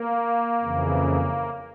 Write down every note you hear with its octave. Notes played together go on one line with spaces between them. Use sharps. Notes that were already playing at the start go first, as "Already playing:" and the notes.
Already playing: A#3
F2 C#3 E3